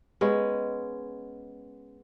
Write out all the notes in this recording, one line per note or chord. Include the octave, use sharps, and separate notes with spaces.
G#3 B3 C#4